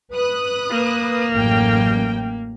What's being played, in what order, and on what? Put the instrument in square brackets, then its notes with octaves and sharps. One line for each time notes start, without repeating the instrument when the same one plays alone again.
[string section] B4 D#6 F#6
[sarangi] A#3
[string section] A1 F#2 G5